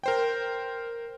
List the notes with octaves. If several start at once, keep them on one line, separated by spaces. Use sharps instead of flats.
A#4 C5 G5